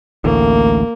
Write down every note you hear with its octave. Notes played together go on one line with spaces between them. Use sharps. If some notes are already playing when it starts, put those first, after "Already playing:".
A1 D2 A2 A#3